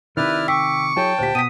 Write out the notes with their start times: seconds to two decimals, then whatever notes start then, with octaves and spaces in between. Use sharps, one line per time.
0.17 C3 D#3 E4 B4 D5 F6
0.48 G5 C#6 D6 E6 B6
0.97 F#3 E4 G#4 C#5 G5 A5
1.19 D2 A#2 G4 C5 B6
1.35 B2 D#6 B6 D#7